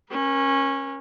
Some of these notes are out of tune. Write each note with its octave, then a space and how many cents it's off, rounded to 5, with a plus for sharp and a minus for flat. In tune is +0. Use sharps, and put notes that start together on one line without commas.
C#4 -20 A#4 +35